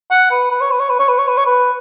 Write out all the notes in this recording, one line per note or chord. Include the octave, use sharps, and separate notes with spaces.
F#5
B4
B4
C#5
B4
C#5
B4
C#5
B4
C#5
B4
C#5
B4